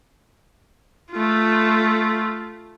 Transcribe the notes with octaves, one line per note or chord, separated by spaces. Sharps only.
A3 F4